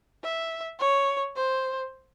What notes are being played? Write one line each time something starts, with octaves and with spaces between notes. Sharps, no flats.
E5
C#5
C5